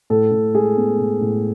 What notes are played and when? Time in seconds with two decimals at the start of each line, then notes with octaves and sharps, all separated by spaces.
0.10 A2 A4
0.31 A2
0.54 G#3 G#4
0.77 B3
0.99 A2
1.21 A2